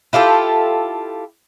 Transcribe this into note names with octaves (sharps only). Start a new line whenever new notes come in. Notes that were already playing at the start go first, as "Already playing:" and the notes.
E4 F4 G4 A4